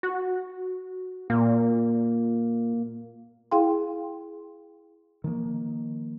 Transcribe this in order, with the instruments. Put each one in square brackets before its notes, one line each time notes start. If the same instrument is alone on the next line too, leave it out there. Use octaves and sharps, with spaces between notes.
[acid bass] F#4
[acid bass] A#2 [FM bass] A#3
[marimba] E4 G#4 F5 G5 C6
[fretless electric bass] D#3 F3 A#3